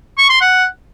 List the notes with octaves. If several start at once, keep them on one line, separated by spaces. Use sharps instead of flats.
C#6
C6
F#5